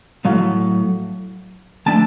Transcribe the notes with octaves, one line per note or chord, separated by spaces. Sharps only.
A2 F#3 A3 F5
F3 A3 D4 A5